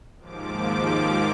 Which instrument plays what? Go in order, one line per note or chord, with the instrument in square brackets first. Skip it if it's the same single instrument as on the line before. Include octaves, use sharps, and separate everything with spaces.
[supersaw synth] D#2 G#2 F3 D6